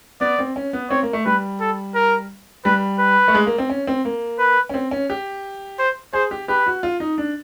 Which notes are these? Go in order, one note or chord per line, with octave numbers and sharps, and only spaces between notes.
B3 D5
C4
C#4
B3
C4 C#5
A#3
A3
G3 B4
A4
A#4
G3 B4
B4
A3
G#3
A#3
C4
C#4
C4
A#3
B4
C#4
C4
C#4
G4
C5
G#4 C5
G4
G4 B4
F#4
F4
D#4
D4